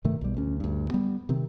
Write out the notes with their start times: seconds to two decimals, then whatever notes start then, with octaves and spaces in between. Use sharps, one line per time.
0.04 G2 C3 D#3 A3
0.21 B1 G3
0.37 D2 C#4
0.60 D2 G2
0.91 G3 B3
1.29 C3 D#3 C4